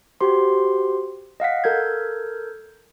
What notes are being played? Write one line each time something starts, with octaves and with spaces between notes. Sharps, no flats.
F#4 G4 C5 C6
D#5 F5 F#5 B6
A4 A#4 G6 G#6